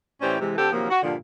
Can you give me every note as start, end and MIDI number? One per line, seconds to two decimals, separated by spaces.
0.21 0.37 45
0.21 0.37 52
0.21 0.37 61
0.21 0.37 67
0.21 0.37 72
0.21 0.37 74
0.40 0.53 48
0.40 0.53 52
0.40 0.53 56
0.57 0.71 50
0.57 0.71 57
0.57 0.71 60
0.57 0.71 67
0.57 0.71 69
0.73 0.87 48
0.73 0.87 51
0.73 0.87 53
0.73 0.87 54
0.73 0.87 58
0.90 1.00 66
1.03 1.15 43
1.03 1.15 46
1.03 1.15 50
1.03 1.15 53